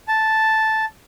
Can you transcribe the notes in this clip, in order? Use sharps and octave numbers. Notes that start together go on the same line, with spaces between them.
A5